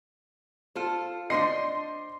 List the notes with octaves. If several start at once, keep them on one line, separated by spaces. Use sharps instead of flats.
F4 A4 C5
D4 C5 D#5 C6 C7